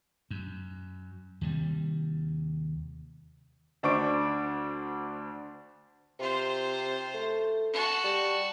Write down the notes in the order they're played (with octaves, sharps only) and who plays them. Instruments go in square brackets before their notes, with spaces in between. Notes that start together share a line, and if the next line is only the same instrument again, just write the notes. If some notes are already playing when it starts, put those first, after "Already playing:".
[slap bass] F#2
D#2 C3 G3
[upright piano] D2 D4 C5 C#6 D6 D7
[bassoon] C3 [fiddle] F4 C5
[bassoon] A3
[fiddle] F#4 A5
[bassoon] G3